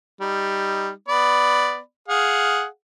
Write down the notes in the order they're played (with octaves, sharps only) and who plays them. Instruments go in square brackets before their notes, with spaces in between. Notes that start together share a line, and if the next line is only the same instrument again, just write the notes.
[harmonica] G3 D#4
B3 D5 B5
G#4 F5 F#5